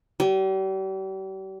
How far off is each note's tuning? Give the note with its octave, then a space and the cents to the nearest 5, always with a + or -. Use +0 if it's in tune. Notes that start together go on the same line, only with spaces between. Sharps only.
G3 -40